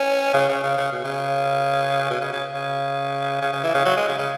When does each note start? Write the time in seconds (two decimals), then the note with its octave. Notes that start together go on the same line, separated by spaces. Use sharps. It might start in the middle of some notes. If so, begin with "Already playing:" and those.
Already playing: C#4
0.34 C#3
0.49 C#3
0.63 C#3
0.78 C#3
0.92 B2
1.04 C#3
2.10 B2
2.21 C#3
2.33 C#3
2.54 C#3
3.42 C#3
3.53 C#3
3.64 E3
3.74 C#3
3.86 F#3
3.97 G#3
4.08 C#3
4.19 C#3